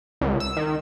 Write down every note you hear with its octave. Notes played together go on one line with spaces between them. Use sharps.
C#2
E6
D#3